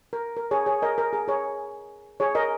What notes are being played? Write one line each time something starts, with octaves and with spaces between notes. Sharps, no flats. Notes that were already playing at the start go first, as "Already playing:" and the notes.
A#4
A#4
G#4 C#5
G#4 C#5
A#4 D#5
A#4
G#4
G#4 C#5
G#4 C#5
A#4 D#5